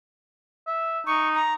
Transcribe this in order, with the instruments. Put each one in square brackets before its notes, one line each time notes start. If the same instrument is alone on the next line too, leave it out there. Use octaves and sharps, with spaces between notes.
[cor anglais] E5
[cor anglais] D#4 [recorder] C#6
[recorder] A#5